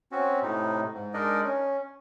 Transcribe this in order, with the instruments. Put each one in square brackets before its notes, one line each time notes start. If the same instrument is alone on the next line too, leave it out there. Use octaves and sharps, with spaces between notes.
[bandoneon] C4 C#4 F#4
A2 C3 D#4
G#2
G#3 D4 D#4 A#4 D5 D#5
C#4